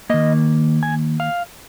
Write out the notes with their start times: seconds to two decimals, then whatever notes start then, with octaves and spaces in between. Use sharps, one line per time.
0.10 D#3 A#3 D#5
0.83 G#5
1.20 F5